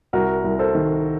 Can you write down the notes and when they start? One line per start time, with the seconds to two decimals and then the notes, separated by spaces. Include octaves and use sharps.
0.13 C2 F#4 A#4
0.44 C2
0.59 A4 C5
0.75 D#3